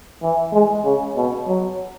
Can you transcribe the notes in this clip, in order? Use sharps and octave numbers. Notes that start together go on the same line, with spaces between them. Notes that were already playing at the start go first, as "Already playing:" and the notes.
E3
G#3
C#3
B2
F#3